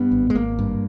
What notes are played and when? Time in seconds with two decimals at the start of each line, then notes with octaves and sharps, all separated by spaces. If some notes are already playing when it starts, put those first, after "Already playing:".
Already playing: G2 B3
0.11 G#1
0.30 G#3
0.35 G#1 A#3
0.59 G2